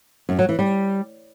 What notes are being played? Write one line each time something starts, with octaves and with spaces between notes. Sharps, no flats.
F#2
F#3
E3
G3